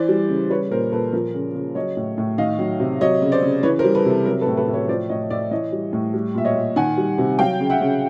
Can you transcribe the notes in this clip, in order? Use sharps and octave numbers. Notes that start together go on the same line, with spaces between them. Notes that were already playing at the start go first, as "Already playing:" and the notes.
Already playing: E3 C5 D5
G3
C#3
G3 B4 C#5
A#2 A#4 C5
A#2 A4 B4
F3 A#4
C#3
C#3
F#3 C#5 D#5
A2
A2
D#3 D#5 F5
F#3
C3
F#3 C#5 D#5
C#3
C5 D5
C#3
E3 B4 C#5
A#4 C5
G3
A4 B4
C3 A4
F#3 A#4
A4 B4
A2
A4 B4
A2
B4 C#5
F3 C5 D5
A2 C#5 D#5
A2 D5 E5
E3 C#5 D#5
G3
A2
G3
A#2 E5
C#5 D#5
A#2
D#3 F#5 G#5
G3
C3
F#3 F5 G5
C#3
E5 F#5
C#3